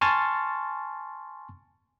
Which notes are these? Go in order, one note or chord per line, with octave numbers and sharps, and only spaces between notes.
G#5 A5 C6 C#6 F6 A6